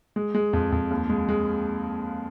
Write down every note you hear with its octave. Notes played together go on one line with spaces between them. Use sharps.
G#3
G#3
F2
F2
D#2
G#3
G#3